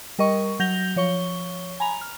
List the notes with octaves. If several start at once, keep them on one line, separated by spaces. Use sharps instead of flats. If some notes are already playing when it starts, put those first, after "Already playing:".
G3 A#4 D#5 C#6
F#3 G6 A#6 F7 G7
F3 C#5 C#6 G7
G#5 A#5 B5 F7
F6